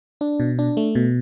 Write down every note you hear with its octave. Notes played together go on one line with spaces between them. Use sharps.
D4
B2
D4
A3
B2